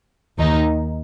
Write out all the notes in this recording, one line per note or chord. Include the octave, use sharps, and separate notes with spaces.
D#2 D#3 D#4